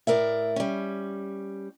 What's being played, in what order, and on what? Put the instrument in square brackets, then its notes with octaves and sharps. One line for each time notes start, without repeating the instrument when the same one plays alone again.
[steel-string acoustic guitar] A2 A#4 D5 E5
G3 C#4